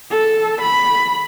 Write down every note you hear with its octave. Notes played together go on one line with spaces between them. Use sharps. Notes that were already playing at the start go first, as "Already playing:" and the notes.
A4
B5